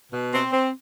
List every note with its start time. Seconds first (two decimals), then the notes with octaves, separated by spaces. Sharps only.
0.12 B2
0.33 C4
0.52 C4